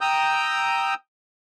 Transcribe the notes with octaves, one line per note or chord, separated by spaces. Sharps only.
G5 A#5 D#6 E6 G6